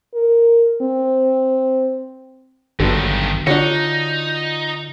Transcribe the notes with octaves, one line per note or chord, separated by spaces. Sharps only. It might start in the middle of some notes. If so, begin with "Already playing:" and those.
A#4
C4
G#1 G2 D3 D#3 F#3 B3
D3 D4 D#4 F4 F#4 C#5 D5